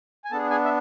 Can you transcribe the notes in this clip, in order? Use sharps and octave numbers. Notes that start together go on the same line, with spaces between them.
G#5
B3 D4 G#4 A4 A5
G#4 G#5
E5